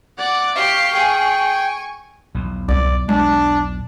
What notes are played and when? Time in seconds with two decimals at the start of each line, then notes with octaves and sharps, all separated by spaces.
0.18 D5 F#5
0.56 G4 F5 C#6
0.94 G#4 G5
1.45 G#5
2.35 B1 E2
2.69 C2 D5
3.09 G#3 D4